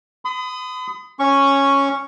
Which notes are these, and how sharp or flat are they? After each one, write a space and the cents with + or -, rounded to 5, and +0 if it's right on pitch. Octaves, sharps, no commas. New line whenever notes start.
B5 +45 D#6 +0
C#4 -5 C#6 +0